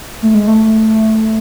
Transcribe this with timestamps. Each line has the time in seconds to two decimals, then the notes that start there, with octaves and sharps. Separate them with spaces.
0.22 A3
0.34 G#3
0.47 A3